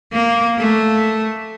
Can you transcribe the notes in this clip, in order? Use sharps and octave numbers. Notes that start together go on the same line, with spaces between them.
A#3
A3